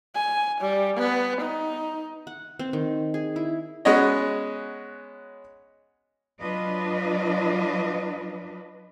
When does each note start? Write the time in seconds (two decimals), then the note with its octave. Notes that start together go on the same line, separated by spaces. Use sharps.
0.15 G#5
0.61 G3
0.97 B3
1.41 D#4
2.27 F#5
2.59 C4
2.73 D#3
3.14 G#4
3.36 E4
3.85 G#3 B3 C#4 F#4 C#5 D#5
6.40 F#3 D4 F4 B4 D#5